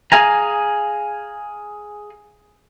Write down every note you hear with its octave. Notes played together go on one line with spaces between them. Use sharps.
G#4 F5 G#5 A#5